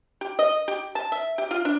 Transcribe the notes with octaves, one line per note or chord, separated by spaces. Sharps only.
G4
D#5
G4
A5
E5
G4
F4
D4